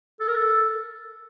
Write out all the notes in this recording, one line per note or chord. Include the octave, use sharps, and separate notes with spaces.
A4
A#4
A4